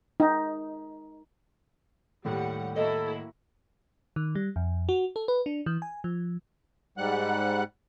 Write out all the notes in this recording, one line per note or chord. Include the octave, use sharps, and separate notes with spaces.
D#4
D#2 A2 G3 F#5
A#3 E4 F#4 A4 D#5
D#3
G3
F2
F#4
A4
B4
D4
E3
G#5
F3
G#2 G3 F#5 F#6